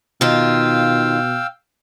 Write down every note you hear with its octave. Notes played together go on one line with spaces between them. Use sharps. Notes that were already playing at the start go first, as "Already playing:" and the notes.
B2 D#3 F4 F5 G5 E6